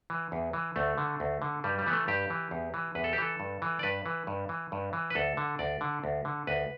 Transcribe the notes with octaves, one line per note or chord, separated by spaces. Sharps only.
E3
E2
E3
D2 A3
D3
D2
D3
G2 G3
G3
E3 B3
A3
G2 G4
E3
E2
E3
E2 B4
A4
G4
E3 A4
G2
E3
D5
G2 B4
E3
G2
E3
G2
E3
B4
D2 A4
D3
D2 D5
D3
D2
D3
D2 B4